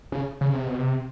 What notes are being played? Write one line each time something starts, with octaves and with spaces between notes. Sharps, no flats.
C#3
C#3
C3
B2
C3